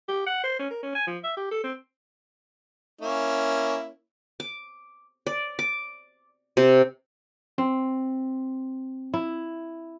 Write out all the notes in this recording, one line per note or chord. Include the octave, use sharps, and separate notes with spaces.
G4
F#5
C5
C#4
A#4
C#4
G#5
F3
E5
G4
A4
C4
A#3 C#4 E4
D6
D5
D6
C3
C4
E4